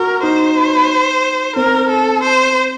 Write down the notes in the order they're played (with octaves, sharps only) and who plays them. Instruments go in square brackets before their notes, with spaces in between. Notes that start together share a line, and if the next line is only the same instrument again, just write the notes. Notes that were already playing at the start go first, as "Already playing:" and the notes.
Already playing: [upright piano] F#4 [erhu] A#4
[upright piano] D#4 [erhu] C5
[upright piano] C4 [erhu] A#4
[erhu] A4
C5